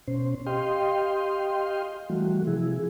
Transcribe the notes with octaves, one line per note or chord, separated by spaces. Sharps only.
B2 C#4 C5
G4 D#5 F5 G5 C6
E3 G3 A3 F#4
C3 F3 E4 G#4